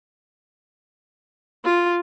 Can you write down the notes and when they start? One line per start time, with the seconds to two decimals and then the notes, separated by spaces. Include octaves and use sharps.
1.65 F4